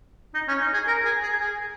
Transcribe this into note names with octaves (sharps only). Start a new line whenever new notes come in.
D#4
C#4
D#4
G#4
A#4
G#4
G#4
G#4